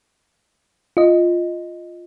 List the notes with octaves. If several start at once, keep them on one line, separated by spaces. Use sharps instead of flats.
F4 D#5